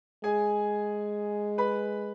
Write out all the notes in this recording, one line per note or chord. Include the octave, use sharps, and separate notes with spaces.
G#3 G#4 G#5
B4 B5